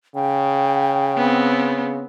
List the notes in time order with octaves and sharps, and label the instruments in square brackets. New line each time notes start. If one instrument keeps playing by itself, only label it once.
[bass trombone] C#3 [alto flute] G5
[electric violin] B3 C4